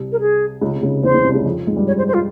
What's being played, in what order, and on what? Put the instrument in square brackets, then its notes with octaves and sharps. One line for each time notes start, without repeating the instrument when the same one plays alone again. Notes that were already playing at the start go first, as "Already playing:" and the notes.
Already playing: [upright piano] C2 C3
[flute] A#4
G#4
[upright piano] C#2 C#3
C3
C#2 C#3
[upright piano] E2 E3 [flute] C5
[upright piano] E2 E3
C2 C3
C#2 C#3
F2 F3
G#2 G#3
G2 G3
[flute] C#5
C5
C5
F4